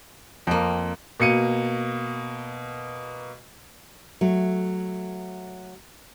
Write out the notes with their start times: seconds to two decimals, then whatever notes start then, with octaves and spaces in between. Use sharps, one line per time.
0.47 F2 A#3 C4
1.20 B2 A#3 C#7 D#7
4.21 F#3 A3